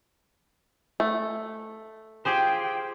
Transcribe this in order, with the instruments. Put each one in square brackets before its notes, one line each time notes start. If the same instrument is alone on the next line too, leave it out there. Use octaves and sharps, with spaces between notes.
[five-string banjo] A3
[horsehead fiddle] F4 G5 [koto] G4 G#4 C5